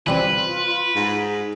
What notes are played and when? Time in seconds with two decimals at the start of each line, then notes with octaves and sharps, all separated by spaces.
0.07 E3 G3 C4 F4 B4
0.95 G#2